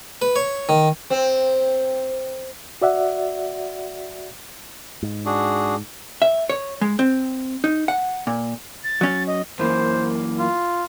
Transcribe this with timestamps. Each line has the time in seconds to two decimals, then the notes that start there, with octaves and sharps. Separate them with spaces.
0.22 B4
0.36 C#5
0.69 D#3
1.10 C4
2.82 F#4 D5 E5 F#5
5.03 G#2
5.26 D4 F#4 G#4
6.22 E5
6.50 C#5
6.81 G#3
6.99 C4
7.64 D#4
7.88 F#5
8.27 A#2
8.84 A6
9.01 F#3 C#4
9.27 D#5
9.59 F#2 E3 A#3 C5
10.39 F4